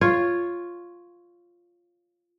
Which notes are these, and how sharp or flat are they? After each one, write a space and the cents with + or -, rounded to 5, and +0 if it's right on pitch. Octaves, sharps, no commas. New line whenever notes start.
F4 +0 C#5 +0